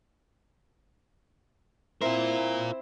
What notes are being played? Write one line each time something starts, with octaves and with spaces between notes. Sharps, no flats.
C4 E4 F4 A#4 C5